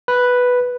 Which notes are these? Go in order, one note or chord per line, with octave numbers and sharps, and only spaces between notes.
B4